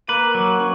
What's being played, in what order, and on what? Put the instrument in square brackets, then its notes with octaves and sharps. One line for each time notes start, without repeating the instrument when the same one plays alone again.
[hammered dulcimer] A#3 [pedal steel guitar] B4
[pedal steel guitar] F#3
[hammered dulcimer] C#4